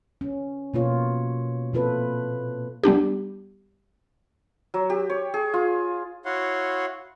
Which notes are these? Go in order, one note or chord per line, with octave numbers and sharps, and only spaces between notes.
C#4
B2 A#3 F4 C#5
A#2 C4 F4 A4 B4
G3 B3 D4 G4
F#3
G4
C#5
G#4
F4
E4 F#4 C#5 F5 F#5 C6